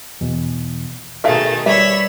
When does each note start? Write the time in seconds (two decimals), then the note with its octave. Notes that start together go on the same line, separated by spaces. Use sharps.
0.21 E2 B2 E3
1.24 B2 D#3 A3 G#4 A4 E5 F5
1.66 G3 B4 C#5 D5 E5 B5 E6